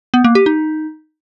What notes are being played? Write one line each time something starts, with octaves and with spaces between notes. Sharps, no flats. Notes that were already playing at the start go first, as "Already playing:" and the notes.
B3
A#3
G4
D#4